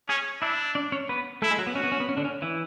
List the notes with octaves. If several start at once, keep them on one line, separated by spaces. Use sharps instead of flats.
C#4 G#4 G#5
D4 E4 E5
D4 D5
C#4 C#5
B3 B4
A3 E4 A4
G#3 G#4
F#3 F#4
B3
C#4 F#4
B3
C#4
B3
C#4
D3 D4
C#4
E3 E4